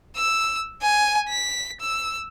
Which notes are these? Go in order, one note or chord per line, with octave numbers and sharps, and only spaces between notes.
E6
G#5
B6
E6